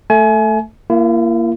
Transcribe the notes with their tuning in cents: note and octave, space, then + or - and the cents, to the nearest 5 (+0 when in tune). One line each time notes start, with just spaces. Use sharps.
A3 +0 G#5 +35
A#3 +0 E4 +45